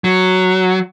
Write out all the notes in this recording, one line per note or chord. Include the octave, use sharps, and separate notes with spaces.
F#3